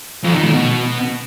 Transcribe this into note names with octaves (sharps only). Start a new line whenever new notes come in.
F2
D#3
A2
B2